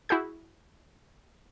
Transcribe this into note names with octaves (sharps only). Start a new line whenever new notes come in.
E4 F#4 G#4 G6